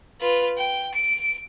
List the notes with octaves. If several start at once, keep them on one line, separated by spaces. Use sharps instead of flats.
F4 B4
G5
D7